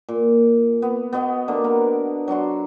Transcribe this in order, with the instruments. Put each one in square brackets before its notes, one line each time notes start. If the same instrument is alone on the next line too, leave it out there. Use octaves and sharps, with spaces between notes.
[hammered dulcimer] A#2
B3
B3 F#4 D#5 G5
D3 A#3
B3 A#4
F#3 D4 F#4 C6